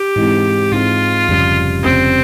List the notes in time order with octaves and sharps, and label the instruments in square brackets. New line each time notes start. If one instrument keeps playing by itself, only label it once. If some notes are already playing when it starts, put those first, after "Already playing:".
Already playing: [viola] G4
[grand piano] G#2 E3 G#3 C4
[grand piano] G#2 E3 G#3 C4 [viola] F4
[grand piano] F1 F2 C#3 G3
[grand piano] F1 F2 C#3 G3 [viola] C4